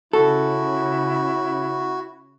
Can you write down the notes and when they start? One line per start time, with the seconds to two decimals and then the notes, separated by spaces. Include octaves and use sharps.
0.13 C#3 E4 F#4 A4